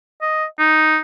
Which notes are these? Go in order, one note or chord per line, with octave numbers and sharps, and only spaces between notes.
D#5
D#4